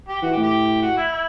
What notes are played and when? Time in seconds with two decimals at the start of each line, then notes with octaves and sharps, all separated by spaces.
0.08 G4
0.22 E3 F#4
0.32 G4
0.37 A2
0.43 G4
0.82 F#4
0.97 E4
1.12 E4